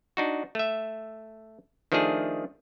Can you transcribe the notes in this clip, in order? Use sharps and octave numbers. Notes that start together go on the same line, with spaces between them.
D4 D#4 F#4
A3 E5
D#3 F3 A3 D4 G#4